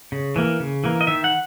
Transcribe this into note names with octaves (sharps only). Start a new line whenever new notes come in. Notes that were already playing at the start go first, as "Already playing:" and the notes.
C#3
E3 A#3
C#3
E3 A#3
D#5
D#3 E5
F#5